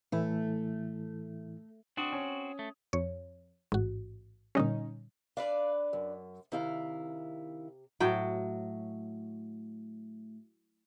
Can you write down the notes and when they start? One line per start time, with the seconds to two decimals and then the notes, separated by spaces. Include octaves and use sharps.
0.12 A2 E3 A3 E4
1.97 C4 D4 F#4 D#6
2.12 C#4
2.59 A3
2.93 F2 C#5
3.72 A1 G#2 F#4
4.55 A#2 D3 G3 C#4 D#4
5.37 D4 B4 D5 F5
5.93 F#2
6.52 C3 D#3 E4 F5
8.00 A2 F#3 G5